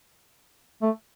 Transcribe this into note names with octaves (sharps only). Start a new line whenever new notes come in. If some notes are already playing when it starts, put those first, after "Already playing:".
A3